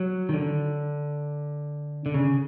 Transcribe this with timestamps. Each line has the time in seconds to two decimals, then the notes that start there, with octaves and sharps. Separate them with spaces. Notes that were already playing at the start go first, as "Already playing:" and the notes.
Already playing: F#3
0.29 D#3
0.34 D3
2.06 D3
2.14 C#3